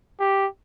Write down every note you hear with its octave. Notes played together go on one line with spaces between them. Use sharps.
G4